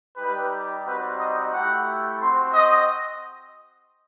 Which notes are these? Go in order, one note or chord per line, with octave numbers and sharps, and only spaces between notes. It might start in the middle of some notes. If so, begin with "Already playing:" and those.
G3 D#4 G4 B4
G3 C4 D#4 F#4 B4
D#5
A3 E4 G4 F#5
C4 F#4 C6
D#5